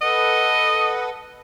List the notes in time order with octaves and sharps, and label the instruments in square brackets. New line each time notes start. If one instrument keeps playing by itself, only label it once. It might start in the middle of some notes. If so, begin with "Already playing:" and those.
[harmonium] A4 B4 F#5 [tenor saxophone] D#5